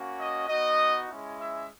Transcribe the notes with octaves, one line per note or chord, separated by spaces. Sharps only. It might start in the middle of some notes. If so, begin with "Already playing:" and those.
Already playing: A#3 C#4 F#4
D#5
B3 D#4 F#4 D#5
G#3 C#4 E4
E5